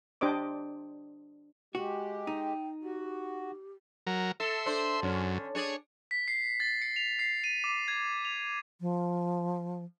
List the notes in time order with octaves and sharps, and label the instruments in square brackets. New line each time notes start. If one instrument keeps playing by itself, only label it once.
[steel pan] D4 G4 C5 D#5 D6
[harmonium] G#3 G4 [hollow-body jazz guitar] F#4
[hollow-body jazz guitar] D#4 [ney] G5
[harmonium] F#4 [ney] G4
[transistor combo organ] F#3 A#4
[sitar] A4 [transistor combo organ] E5 C6
[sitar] D4 C5
[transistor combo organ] F#2 [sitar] D3 C#4
[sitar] D4 G#4 D5 [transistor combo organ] C#5
[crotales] B6
C7
A6
C#7
F7
C7
D#7
D6
G#6
F7
[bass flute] F3